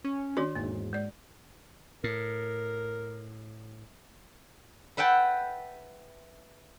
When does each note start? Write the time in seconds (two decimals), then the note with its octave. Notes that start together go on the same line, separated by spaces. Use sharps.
0.04 C#4
0.37 D#3 D4 F#4 C#5 C6
0.55 E1 G#2 A#3
0.93 G#3 D5
2.04 A2 A#4
4.97 B4 E5 F#5 G5 A5